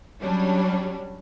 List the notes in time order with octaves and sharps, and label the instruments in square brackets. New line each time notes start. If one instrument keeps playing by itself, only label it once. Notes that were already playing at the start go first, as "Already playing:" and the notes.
[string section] F#3 G3 C#4 D4